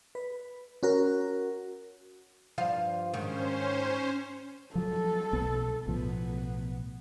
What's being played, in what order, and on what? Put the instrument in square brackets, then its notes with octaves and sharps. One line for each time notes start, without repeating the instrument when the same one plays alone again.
[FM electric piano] B4
C#4 F#4 A#4
[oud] G2 F3 F5
[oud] G#2 D#3 [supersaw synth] C#4 C5
[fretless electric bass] F3 F#3 [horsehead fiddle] A4
[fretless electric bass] B1 B3
[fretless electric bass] B1 A2 F3 [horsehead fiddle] B3